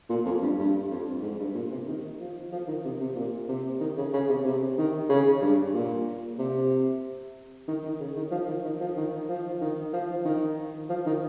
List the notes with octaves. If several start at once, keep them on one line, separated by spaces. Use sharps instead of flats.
A#2
F2
G2
G2
F2
G#2
G2
A#2
C3
D#3
F3
F3
D#3
C3
C3
A#2
C3
D#3
C#3
C#3
C3
C3
D#3
C#3
G2
A#2
C3
D#3
D#3
C#3
D#3
F3
D#3
D#3
F3
D#3
F3
D#3
F3
D#3
F3
D#3